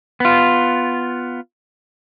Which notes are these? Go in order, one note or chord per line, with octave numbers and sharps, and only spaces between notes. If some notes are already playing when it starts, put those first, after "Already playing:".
B3 F4